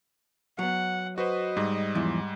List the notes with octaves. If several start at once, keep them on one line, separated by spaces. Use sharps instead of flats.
F#3 B3 F#5
F#4 B4 C5 D#5
G#2 G3
E2 F3 E4